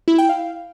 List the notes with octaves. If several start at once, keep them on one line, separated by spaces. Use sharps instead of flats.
E4
G5
F5